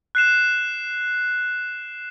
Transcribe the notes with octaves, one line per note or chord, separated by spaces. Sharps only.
F#6 C7 E7